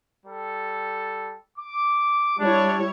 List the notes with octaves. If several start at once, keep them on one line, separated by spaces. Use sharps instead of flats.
G3 A4
D6
G3 D4 E4 C#5